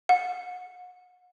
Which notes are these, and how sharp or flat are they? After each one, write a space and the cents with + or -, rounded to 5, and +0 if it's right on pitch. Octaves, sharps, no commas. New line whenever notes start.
F#5 -35